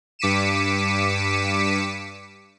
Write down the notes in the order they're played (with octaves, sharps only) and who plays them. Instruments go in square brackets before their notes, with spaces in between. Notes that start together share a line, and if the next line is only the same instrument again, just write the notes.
[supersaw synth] G2 D6 B6 C#7 D#7 E7